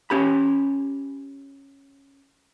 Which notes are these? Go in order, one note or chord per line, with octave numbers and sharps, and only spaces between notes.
C#4 G4 B5